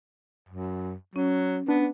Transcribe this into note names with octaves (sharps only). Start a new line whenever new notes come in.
F#2
F#3 C#4
B3 D4